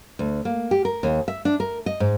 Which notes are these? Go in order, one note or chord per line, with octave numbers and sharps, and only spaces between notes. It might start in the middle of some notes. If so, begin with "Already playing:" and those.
D2
A#3
G4
A#4
D#2
E5
D4
A#4
D#5
G#2